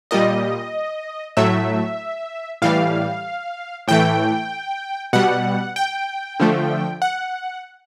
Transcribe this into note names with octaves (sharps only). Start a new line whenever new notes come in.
A#2 G3 D#5
A2 F#3 A3 E5
A2 E3 G3 F5
A2 E3 A3 G5
B2 G3 F#5
G5
D3 F3 A3
F#5